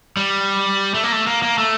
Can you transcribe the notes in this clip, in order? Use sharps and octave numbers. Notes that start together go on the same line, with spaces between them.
G3
A3
A#3
A3
A#3
A#3
A3